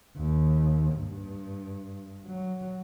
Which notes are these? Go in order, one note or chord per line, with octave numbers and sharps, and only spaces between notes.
D#2
G2
F#3